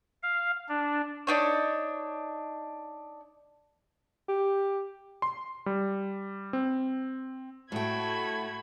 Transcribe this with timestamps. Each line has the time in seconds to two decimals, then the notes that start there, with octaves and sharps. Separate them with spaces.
0.23 F5
0.68 D4
1.27 D4 D#4 C#5
4.29 G4
5.22 C6
5.66 G3
6.53 C4
7.72 A2 A3 F#4 A4 G5 B5 G#6